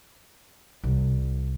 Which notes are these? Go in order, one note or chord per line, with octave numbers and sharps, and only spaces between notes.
C2